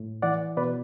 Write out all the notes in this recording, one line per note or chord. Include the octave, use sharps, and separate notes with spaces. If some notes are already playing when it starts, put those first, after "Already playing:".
Already playing: A2
E3 D5 F#5
B2 B4 D5